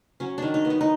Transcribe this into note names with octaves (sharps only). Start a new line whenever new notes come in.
F#3 C#4
D#3 D4
D#4
B3
D#4
D#4